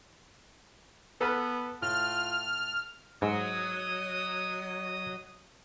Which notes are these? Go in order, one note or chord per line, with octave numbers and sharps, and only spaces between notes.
B3 A4 B4 F6
A2 F4 F6
G#2 F#3 D#5 D#6